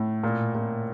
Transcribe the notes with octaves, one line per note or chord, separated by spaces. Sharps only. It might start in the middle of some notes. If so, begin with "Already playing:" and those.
Already playing: A2
A#2
A#2